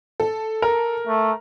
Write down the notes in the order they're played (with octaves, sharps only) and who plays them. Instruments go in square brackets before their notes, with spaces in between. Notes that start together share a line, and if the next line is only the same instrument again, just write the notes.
[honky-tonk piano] A4
[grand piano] A#4
[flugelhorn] A3